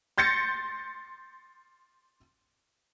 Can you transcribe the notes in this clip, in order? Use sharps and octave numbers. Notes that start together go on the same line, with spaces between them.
C6 G6 A6 A#6 C#7